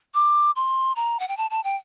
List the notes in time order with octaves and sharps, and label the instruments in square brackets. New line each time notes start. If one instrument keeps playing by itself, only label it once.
[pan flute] D6
C6
A#5
F#5
G5
A5
A5
G5